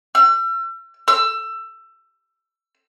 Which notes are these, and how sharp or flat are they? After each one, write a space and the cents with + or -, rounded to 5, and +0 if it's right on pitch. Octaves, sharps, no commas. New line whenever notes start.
E6 +40
E6 +20